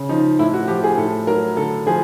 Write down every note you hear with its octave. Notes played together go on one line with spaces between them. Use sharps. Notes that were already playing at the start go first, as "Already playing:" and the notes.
Already playing: C#3
F3 D#4
A2 E4
F#4
F3 G4
G#4
A2 A4
F#3 A#4
D3 A4
F3 G#4